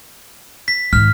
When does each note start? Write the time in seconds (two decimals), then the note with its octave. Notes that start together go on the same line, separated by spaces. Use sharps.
0.68 B6
0.93 G#2 D#3 F6